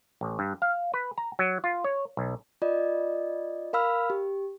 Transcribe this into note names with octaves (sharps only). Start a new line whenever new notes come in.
A1
G2
F5
B4
A#5
F#3
F4
C#5
B1
F4 D5 D#5
A#4 F5 B5 E6 F6
G4